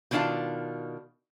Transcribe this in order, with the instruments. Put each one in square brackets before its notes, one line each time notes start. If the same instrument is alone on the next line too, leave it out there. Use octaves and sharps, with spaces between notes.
[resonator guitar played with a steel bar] B2 D#3 D4 E4 F4 A5